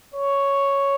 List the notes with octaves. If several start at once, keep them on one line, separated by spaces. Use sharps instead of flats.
C#5